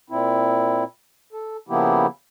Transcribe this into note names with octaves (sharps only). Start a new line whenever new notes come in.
A#2 C4 E4
A4
C#3 F3 A#3 B3 E4 G4